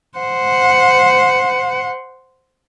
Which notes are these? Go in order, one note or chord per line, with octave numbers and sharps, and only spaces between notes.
C5 F#5